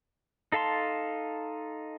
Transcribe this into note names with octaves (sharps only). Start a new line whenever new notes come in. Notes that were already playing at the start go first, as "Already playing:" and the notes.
D#4 A4 F5 A5 C6